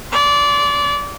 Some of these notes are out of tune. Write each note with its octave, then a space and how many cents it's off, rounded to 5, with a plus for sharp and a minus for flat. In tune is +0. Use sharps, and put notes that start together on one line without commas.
D5 -25 C6 +0